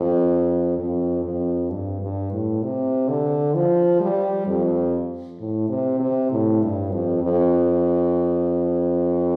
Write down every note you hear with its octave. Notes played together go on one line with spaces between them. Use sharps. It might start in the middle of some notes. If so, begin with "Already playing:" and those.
Already playing: F2
F2
F2
G2
G2
A2
C3
D3
F3
G3
F2
A2
C3
C3
A2
G2
F2
F2